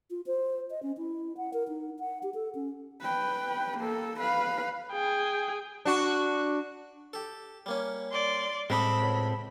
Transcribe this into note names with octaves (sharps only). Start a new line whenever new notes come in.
F4
C5
D#5
C#4
E4
F#5
A#4
D#4
F#5
G4
A4
C#4
B4 G5
A#3 A4
B4 F5
G#4 G5
D4 F#4
G4 A4
G3 A#3 C#4
D5 C6
A2 G3 G#3 C4 A4 C5 D#5 B5
C#2